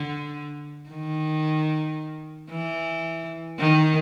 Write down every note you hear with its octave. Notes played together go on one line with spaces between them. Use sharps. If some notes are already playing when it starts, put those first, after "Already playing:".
Already playing: D3
D#3
E3
D#3